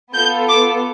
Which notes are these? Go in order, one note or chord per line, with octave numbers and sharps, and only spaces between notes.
B3 F4 A4 G6
D6